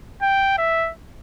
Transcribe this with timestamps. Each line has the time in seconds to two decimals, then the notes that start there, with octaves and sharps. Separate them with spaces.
0.22 G5
0.58 E5